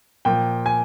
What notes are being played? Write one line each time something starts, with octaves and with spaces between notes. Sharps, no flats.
A#2 F3 G5
G#5